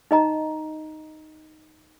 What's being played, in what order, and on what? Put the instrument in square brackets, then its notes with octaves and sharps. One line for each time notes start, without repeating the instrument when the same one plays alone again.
[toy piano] D#4 D#5 A#5